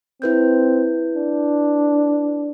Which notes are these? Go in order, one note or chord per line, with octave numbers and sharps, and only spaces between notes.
C4 E4 B4 G6
D4